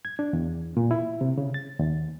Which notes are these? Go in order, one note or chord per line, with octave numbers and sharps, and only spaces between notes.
G#6
D4
E2
A#2
E4
C3
C#3
A6
D#2